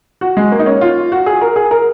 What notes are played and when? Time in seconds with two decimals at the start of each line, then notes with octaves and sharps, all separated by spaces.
0.21 F#4
0.37 G#3
0.52 A#3
0.59 D#4
0.66 C#4
0.81 F4
1.12 F#4
1.26 G#4
1.41 A#4
1.56 G#4
1.71 A#4